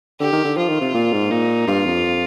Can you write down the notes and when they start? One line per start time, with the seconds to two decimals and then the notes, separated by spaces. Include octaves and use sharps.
0.20 D3 G4
0.32 D#3
0.44 D3
0.57 F3 F4
0.69 D#3
0.81 C3
0.94 A#2
1.12 G#2
1.30 A#2 D#4
1.67 G2 F4
1.86 F2